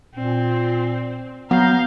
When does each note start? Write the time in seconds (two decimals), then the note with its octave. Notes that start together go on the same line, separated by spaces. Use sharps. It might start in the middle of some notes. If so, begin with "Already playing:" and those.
0.15 A#2 C4
1.51 F#3 B3 F5 A#5 G6